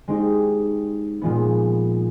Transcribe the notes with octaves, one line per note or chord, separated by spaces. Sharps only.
G#3 C4 D#4 G4
A#2 F3 G#3 B3